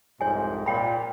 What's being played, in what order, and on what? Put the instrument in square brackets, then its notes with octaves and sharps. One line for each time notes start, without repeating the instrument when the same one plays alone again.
[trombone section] C2 F2 G#2 [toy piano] C#5 G#5
[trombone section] A#2 [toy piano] C#5 G5 B5